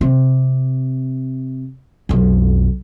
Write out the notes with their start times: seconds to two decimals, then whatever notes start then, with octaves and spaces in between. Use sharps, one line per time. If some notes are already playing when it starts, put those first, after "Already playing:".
0.01 C3
2.09 B1 F2